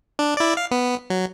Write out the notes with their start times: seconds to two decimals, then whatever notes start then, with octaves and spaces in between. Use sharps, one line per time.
0.19 D4
0.37 E4 D5
0.57 F5
0.71 B3
1.10 F#3